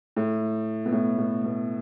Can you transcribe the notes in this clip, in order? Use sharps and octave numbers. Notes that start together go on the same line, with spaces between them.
A2
B2
A2
B2
B2